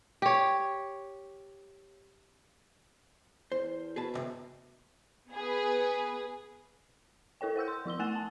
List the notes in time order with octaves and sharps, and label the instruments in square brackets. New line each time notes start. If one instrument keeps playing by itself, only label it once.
[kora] G4 C#5
[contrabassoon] E2 [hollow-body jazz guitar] C5
[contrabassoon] B2 [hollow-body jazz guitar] G#4 B4 A5
[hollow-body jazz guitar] C#2 G2 C3
[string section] B3 G#4 B4
[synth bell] E4 A4 C#5 G5
C5 F#5 E6 G6
C6
F3 E4 E6 G7
A3 F#5 G#5 F#6 A6 E7
A5